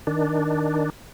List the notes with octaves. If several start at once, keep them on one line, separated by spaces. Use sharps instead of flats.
D#3 D4